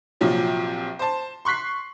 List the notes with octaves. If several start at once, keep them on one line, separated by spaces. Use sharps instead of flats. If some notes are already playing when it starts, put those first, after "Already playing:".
A#1 C3 F3 F#3
C5 A5
C6 C#6 F#6 B6 C7